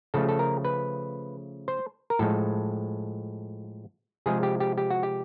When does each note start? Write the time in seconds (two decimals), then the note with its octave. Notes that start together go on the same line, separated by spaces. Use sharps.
0.14 C#3 F3 A3 A4
0.29 A4
0.39 A#4
0.65 B4
1.68 C5
2.10 A#4
2.19 A2 F3 G#3 A4
4.26 C3 F3 G#3 G#4
4.43 G4
4.60 G4
4.78 G4
4.91 F#4
5.03 G4